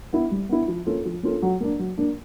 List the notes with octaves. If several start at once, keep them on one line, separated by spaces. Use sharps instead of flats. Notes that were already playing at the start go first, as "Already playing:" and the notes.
B3 E4
G3
B3 E4
F3
A#3 C#4 F4 A4
F3
A#3 C#4 F4 A4
F#3
A#3 D4
F#3
A#3 D4